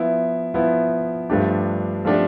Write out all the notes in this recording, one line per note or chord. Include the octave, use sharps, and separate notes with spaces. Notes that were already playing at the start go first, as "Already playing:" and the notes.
Already playing: F3 B3 E4
F3 B3 E4
G2 F3 A3 D4 G4
F3 A3 D4 G4